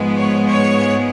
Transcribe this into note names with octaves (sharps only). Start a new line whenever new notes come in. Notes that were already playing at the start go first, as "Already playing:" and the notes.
Already playing: G#2 F3 G#3 B3
C#5
C#5